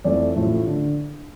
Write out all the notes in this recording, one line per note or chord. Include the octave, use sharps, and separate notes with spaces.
F2 E3 A3 D5
A1 A2 F3 A3
D3